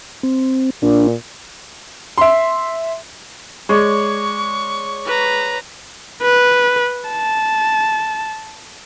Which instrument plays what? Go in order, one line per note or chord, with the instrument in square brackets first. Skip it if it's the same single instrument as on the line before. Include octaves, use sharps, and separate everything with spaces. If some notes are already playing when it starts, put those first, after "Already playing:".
[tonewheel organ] C4
[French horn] A#2 [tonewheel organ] D4
[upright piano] E5 C6
[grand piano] G#3 [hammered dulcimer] C#5 D5 [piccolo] C#6
[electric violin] B4 A#5
B4
A5